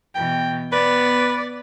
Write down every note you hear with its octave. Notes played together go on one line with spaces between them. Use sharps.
B2 E3 G5
B3 B4 D5